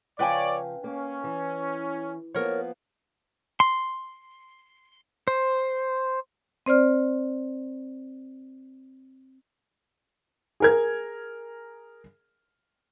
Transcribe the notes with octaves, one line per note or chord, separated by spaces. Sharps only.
C#3 F3 B4 C#5 D5 F5 G5 G#5
A#3 C#4
E3
F3 A#3 B3 A#4 C#5
C6
C5
C4 C5 D5 F6
G#4 A#4 G#6